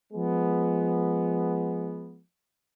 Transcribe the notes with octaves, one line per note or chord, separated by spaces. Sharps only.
F3 G#3 B3